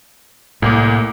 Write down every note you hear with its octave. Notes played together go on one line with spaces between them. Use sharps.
C2 A2 A#3 D6